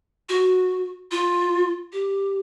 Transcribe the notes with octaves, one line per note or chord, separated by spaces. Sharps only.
F#4
F4
G4